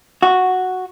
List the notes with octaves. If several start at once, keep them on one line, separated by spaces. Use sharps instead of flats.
F#4